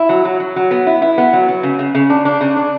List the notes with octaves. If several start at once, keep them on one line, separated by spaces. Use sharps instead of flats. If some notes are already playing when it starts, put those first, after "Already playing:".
Already playing: E4
F#3
F#3
F#3
F#3
B3
E4
E4
B3
F#3
F#3
C#3
C#3
C#3
D4
D4
C#3
D4